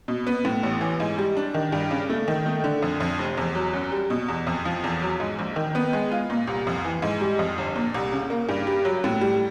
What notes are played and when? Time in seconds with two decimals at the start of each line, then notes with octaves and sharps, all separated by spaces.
0.08 B2
0.27 B3
0.45 A2
0.63 A1
0.81 E3
1.00 G#2
1.18 G3
1.37 D4
1.54 D#3
1.72 G2
1.91 C#3
2.10 A3
2.28 D#3
2.46 A3
2.64 D3
2.82 F2
3.00 F2
3.19 F1
3.37 E2
3.55 F#3
3.73 F#2
3.92 G3
4.10 B2
4.28 E2
4.47 F2
4.65 F3
4.84 E2
5.02 F#3
5.20 G#2
5.39 A#1
5.56 D#3
5.75 B3
5.93 G#3
6.12 F4
6.30 A#2
6.47 C2
6.67 F2
6.84 E3
7.02 G#2
7.21 G3
7.39 F2
7.58 G1
7.76 A#2
7.94 C2
8.12 C#3
8.30 A#3
8.49 G2
8.67 G3
8.85 F#3
9.04 A2
9.21 G3